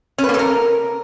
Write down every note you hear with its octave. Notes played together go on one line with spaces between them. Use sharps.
C#4
B4
A#3
A4
A#4